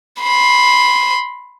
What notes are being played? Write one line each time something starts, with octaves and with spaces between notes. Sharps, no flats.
B5 C6